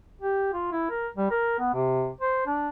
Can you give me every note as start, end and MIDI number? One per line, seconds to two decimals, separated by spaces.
0.21 0.52 67
0.54 0.67 65
0.72 0.90 64
0.90 1.08 70
1.17 1.29 55
1.31 1.56 70
1.59 1.72 59
1.74 2.10 48
2.21 2.43 72
2.46 2.69 62